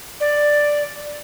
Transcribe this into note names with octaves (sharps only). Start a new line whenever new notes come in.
D5